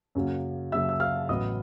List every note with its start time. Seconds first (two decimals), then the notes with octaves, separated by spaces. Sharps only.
0.15 F#2 C#3 F#3 A#3
0.72 F#2 C#3 F#3 A#3 E5 E6
0.89 E6
1.00 F5 F6
1.29 A1 A2 F#3 B3 D#5 D#6